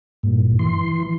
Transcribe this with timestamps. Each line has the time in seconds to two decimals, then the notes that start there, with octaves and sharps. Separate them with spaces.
0.23 G2 A#2
0.59 E3 C6